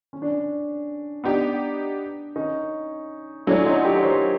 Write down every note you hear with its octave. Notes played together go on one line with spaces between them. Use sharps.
C#4
D4
C#4
B3 D4 D#4 G4
C#4 D#4
F#3 A3 C#4 D4 E4
D#4 F4
F#4
F4 G4
C#5
A#4 C5